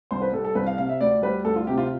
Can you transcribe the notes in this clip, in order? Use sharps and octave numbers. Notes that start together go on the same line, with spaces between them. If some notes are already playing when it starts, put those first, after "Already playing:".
C2 C5
B4
G3 A4
A4
C2 B4
F5
C3 F5
E5
D2 D5
G3 B4
D2 A4
F4
C3 G4
F4